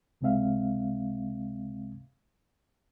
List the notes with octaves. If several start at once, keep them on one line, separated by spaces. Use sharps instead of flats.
C#2 C3 G#3 C4 E5 F5